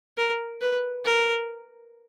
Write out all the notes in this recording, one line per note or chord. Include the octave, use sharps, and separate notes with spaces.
A#4
B4
A#4